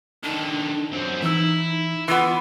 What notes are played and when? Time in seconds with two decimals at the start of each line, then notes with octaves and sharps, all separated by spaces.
0.23 D3 D#3 D4
0.92 F#2 C4
1.23 E3 D#4 E4 E6
2.08 E3 B3 F4